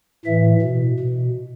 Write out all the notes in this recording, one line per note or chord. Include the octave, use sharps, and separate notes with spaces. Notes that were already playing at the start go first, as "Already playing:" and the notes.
A2 E3 E5
B2
B2